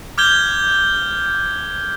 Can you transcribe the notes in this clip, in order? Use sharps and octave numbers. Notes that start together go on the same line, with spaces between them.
D6 F6 G6 G#6 G7